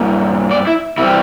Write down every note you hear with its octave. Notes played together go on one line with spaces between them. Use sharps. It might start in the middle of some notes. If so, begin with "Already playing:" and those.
Already playing: G2 A#3
D5
E4
C3 E3 G3 E4